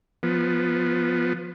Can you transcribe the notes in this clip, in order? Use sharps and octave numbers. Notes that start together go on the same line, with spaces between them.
F3 B3